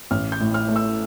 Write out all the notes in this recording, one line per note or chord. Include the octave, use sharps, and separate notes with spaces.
A1 F6
G6
A2
F6
A3
E6